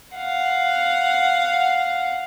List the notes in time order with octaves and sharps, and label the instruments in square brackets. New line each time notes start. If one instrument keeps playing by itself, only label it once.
[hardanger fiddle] F5 F#5